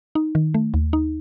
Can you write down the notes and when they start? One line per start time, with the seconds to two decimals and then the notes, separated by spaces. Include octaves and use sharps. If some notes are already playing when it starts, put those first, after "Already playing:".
0.15 D#4
0.35 D#3
0.54 A3
0.74 D#2
0.93 D#4